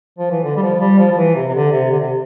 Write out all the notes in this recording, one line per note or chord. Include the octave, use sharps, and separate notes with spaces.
F3
E3
D3
G3
F3
G3
F3
F3
E3
C3
C3
D3
C3
D3
C3